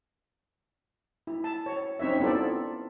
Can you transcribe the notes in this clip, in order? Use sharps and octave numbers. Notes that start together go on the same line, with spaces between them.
E4
A5
C#5
C4 C#4 D#4 C#5 E5
B3 E4 F4 A4 D5